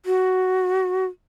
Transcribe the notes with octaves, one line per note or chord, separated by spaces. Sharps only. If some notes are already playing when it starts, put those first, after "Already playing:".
F#4